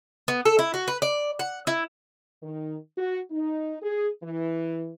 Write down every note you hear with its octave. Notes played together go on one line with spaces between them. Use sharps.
B3
A4
E4
F#4
B4
D5
F#5
E4
D#3
F#4
D#4
G#4
E3